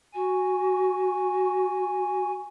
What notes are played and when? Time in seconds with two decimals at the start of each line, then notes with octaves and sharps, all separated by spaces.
0.14 F#4 G#5